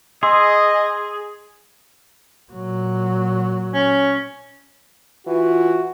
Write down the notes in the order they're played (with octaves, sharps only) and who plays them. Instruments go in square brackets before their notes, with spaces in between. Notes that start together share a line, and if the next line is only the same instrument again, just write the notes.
[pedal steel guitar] G#4 [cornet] D#5 [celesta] C6 E6
[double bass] A#2 F#3
[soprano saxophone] C#4
[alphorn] E3 [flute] F4 [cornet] F#4